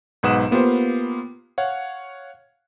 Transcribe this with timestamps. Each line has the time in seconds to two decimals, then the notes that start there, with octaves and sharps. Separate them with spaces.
0.23 B1 G#2 B4 F#5 D#6 E7
0.51 A#3 B3 F4 G4 C5
1.58 C#5 F5 F#5